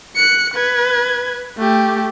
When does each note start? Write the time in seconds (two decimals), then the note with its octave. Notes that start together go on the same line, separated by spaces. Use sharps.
0.15 F#6 C#7
0.54 B4 G#6
1.58 A3 G4